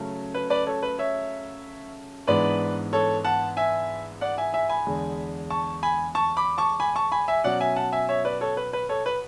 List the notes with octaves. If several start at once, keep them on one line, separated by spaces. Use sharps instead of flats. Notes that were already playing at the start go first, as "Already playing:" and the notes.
Already playing: C#3 F#3 A3 C#4
B4
B4 D5
A4 C#5
B4
C#5 E5
G#2 E3 G#3 B3 D4 B4 D5
A4 C#5
F#5 A5
E5 G#5
D5 F#5
E5 G#5
E5 G#5
G#5 B5
E2 D3 G#3
A5 C#6
G#5 B5
A5 C#6
B5 D6
A5 C#6
G#5 B5
A5 C#6
G#5 B5
E5 G#5
B2 F#3 C#4 D5 F#5
E5 G#5
F#5 A5
E5 G#5
C#5 E5
B4 D5
A4 C#5
B4
B4
A4 C#5
B4